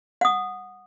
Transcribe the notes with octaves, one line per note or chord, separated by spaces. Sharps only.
F#5 D#6